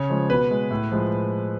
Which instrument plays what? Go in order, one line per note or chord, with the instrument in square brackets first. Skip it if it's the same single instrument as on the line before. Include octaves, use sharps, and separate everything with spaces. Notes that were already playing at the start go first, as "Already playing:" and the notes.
Already playing: [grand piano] C#3 C#5
F3 G#3
B2 B4
G#3
A2
F3 G#3